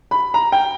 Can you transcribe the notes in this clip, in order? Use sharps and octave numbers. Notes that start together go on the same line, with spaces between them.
B5
A#5
G5